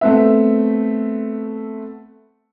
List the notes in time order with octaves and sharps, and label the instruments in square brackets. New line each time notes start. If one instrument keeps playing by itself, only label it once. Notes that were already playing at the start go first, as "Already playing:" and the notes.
[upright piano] A3 B3 C4 B4 E5